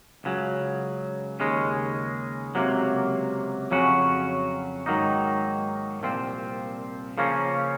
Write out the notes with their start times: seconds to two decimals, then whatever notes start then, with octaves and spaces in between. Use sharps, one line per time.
0.24 C#2 C#3 F#3
1.40 D#2 C#3 G#3 C#4
2.55 C#2 C3 F#3 A#3
3.71 F2 C#3 F#3 C#4 F#4
4.86 G#2 D#3 F#3 A#3 D#4
6.02 C2 A#2 F3 C4
7.18 C#3 F3 A#3 C#4